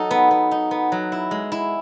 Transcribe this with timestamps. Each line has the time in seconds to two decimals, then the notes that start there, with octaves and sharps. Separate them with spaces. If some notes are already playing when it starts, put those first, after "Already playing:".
Already playing: F#3 D#4 A4
0.11 B3
0.31 B3
0.51 D#4
0.71 B3
0.92 F#3
1.12 E4
1.31 G#3
1.52 E4